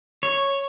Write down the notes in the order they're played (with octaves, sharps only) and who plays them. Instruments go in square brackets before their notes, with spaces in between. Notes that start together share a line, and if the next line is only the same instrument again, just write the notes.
[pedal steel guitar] C#5